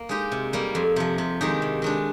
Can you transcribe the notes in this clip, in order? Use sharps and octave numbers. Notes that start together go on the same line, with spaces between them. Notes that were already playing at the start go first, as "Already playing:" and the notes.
Already playing: A#3
G#3 D#4 G4
C3
G3 A#3
F2
C3 F3
C3
D#3 G#3 D#4 G4
C3
D#3 G#3 D4